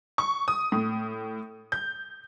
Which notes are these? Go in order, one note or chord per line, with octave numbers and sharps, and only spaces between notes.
C#6
D#6
A2
G6